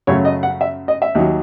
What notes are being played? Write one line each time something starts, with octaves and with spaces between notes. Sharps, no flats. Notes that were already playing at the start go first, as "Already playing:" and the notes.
F#2 C#3 F#3 A3 C#5
D#5
F#5
E5
D#5
E5
D#2 D#3 F#3